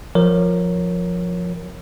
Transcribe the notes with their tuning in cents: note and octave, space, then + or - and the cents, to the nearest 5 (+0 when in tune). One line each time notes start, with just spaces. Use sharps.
F3 +15 A#4 +0 C#5 +0